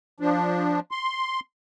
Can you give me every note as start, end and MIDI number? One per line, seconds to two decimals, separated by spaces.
0.20 0.80 53
0.20 0.80 62
0.91 1.40 84